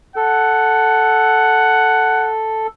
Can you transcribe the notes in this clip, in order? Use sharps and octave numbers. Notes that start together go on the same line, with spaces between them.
A4 F#5